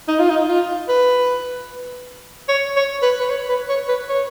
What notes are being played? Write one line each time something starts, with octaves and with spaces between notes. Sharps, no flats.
D#4
F4
D#4
F4
B4
C#5
C#5
B4
B4
C#5
B4
C#5
B4
C#5